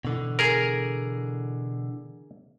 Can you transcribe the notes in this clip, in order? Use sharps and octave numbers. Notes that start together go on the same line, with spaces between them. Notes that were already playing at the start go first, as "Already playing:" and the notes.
B2 D3 E3
G#4 A#4